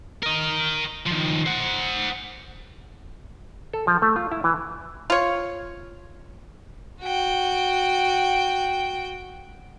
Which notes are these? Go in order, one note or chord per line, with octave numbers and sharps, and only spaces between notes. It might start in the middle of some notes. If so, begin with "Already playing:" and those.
A#4 D#5
D#3 F3
C5 F#5
A4
F3
A3
F4
E4
E3
F4 C#5
F#4 G5